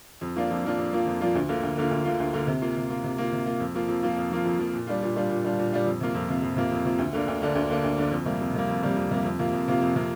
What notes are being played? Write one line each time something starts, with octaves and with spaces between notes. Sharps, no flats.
F2
F3 A#3 D4 F4
F2
F3 A#3 D4 F4
F2
F3 A#3 D4 F4
F2
F3 A#3 D4 F4
D2
D3 A#3 F4
D2
D3 A#3 F4
D2
D3 A#3 F4
D2
D3 A#3 F4
C3
A#3 F4
C3
A#3 F4
C3
A#3 F4
C3
A#3 F4
F2
F3 A#3 F4
F2
F3 A#3 F4
F2
F3 A#3 F4
F2
F3 A#3 F4
A#2
G3 D4 F4
A#2
G3 D4 F4
A#2
G3 D4 F4
A#2
G3 D4 F4
F2
C3 A#3 F4
F2
C3 A#3 F4
F2
C3 A#3 F4
F2
C3 A#3 F4
D2
D3 A#3 D4
D2
D3 A#3 D4
D2
D3 A#3 D4
D2
D3 A#3 D4
F2
C3 G3 A#3
F2
C3 G3 A#3
F2
C3 G3 A#3
F2
C3 G3 A#3
F2
C3 A#3 F4
F2
C3 A#3 F4
F2
C3 A#3 F4